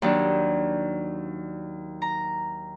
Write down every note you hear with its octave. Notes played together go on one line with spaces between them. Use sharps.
D#2 F#3 D4
A#5